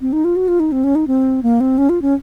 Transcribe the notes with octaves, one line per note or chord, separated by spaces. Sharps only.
C4
D#4
F4
F#4
F4
D#4
C4
C#4
D#4
C4
A#3
C4
C#4
F4
C#4